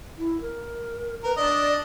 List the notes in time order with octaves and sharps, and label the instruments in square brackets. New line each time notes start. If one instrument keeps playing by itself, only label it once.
[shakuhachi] E4
A#4
[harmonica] A#4 [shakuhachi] B4
[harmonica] D4 D#5 [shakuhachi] D5